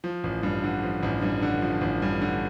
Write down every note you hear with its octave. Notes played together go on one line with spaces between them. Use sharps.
F3
A1
G2
D3
F3
A1
G2
D3
F3
A1
G2
D3